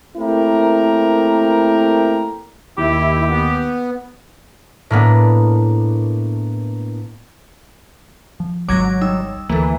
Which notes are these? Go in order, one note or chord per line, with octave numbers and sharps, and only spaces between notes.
A3 A#3 C4 E4 G4 A#4
D#2 E4 G4
B3
A2 A#3 B3 D4
F3
G#1 C#2 F#3 G#3 D6 G#6 A#6
G3 D#4 E6
D2 E3 A#3 A4